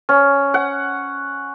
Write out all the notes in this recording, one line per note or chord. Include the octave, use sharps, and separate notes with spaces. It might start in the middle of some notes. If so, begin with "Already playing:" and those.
C#4
F#5